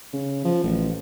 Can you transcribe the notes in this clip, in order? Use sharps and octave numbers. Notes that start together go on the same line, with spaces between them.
C#3
F3
A1